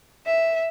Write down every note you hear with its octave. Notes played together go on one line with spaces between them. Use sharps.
E5